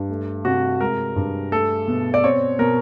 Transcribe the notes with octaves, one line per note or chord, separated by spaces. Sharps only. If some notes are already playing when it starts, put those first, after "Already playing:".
Already playing: G2
A3
C3 F#4
G#3 A#4
G2
A3 A4
B2
D5
C4 C#5
B2 A#4